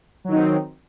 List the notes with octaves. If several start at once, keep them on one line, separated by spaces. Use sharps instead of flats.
D#3 F#3 C4 D#4